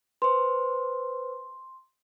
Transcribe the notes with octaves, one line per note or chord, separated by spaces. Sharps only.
B4 C5 C6